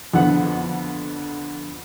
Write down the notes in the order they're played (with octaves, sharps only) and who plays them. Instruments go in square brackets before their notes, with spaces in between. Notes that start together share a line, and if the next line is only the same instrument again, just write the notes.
[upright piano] F2 D3 F3 B3 F#5